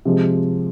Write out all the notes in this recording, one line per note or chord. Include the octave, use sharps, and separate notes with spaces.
C3 F3 G#3